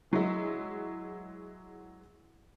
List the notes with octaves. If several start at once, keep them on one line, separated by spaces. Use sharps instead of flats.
E3 F#3 G#3 E4